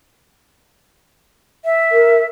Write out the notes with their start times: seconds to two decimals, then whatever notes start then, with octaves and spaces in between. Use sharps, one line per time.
1.65 E5
1.92 A#4